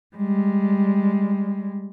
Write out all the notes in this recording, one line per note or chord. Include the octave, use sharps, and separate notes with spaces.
G3 G#3